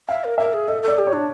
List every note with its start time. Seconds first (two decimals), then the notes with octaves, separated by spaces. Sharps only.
0.09 E5 F5
0.24 A#4
0.38 A#4 E5
0.53 G#4
0.68 A4 D#5
0.82 A4
0.88 D5
0.98 G4
1.07 C#5
1.13 D4